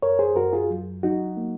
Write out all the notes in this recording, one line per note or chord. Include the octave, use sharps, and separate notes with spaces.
F#2 A#4 C#5
G#4 C5
F#2 F#4 A#4
F4 G#4
F#3
F#3 D#4 F#4
A#3